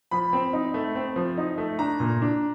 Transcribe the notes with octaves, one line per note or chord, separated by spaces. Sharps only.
F3 B5
C4
D#4
A3
C4
F3
D#4
A3
D4 A#5
A#2
D4